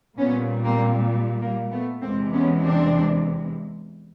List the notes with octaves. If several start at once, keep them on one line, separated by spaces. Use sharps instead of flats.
A#2 G3 B3 C#4
A#3 C4
A#3
A3 B3
E2 C3 E3 G#3 A#3 C4
B3 C#4
C4 D4